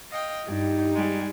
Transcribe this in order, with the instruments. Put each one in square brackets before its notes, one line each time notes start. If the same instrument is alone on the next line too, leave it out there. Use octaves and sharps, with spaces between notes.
[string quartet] D#5 F5 G5
[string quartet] G2 [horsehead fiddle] D#4 G4
[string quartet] G3 G#3